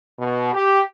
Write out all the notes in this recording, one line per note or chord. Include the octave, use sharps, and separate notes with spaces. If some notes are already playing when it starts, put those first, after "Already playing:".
B2
G4